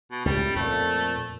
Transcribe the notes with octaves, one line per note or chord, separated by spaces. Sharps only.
B2
C#2 A2 G3
F2 A#2 A3